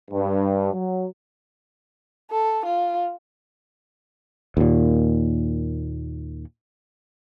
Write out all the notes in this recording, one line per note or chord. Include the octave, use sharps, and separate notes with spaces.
G2
F#3
A4
F4
D#2 A#2